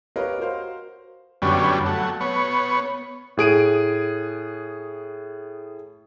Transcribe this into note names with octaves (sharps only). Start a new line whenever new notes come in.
G4 A#4 B4 C#5 D#5 F5
F#4 A#4 C5 F5
F#2 D3 G3 B3 C#4
F#3 A3
B3 C#5
A2 G#4 D7 D#7